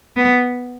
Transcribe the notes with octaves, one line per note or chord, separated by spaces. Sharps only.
B3